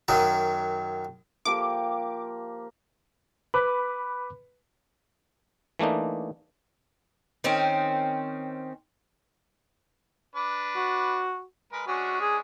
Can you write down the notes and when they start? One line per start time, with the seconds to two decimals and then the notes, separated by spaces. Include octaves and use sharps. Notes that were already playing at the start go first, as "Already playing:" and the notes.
0.08 F#2 D#3 F#3
1.45 F3 A#3 G4 D6
3.54 B4 B5 D6
5.79 E3 A3 A#3 D4 D#4
7.44 D#3 C4 C#4
10.36 D4 B4
10.76 F#4
11.72 G#3 A#4 B4
11.87 G#3 C#4 D4 F#4
12.21 G#4